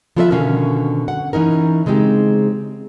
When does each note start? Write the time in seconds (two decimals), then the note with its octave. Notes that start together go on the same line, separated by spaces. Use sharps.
0.16 F3 B3 F4 A4 D#5 E5
0.31 B2 D3 D#3 C#4 F#4 F5
1.08 F#5
1.33 E3 C#4 D#4 A#4
1.86 C#3 G#3 C4 D#4 G4